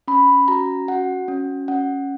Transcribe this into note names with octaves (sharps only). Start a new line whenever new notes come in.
C#4 B5
F#4 A#5
F#4 F#5
C#4
C#4 F#5